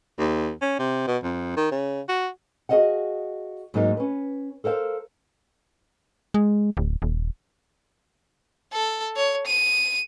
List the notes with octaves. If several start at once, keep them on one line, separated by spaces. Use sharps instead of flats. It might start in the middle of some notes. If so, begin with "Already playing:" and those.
D#2
C#4
C3
B2
F2
D#3
C#3
F#4
F#4 G#4 C5 D#5 F5 F#5
G#2 F#3 A#3 D#4 A#4
C#4 B4
A4 A#4 C5 F5
G#3
D1
D#1
A4
C#5
D#7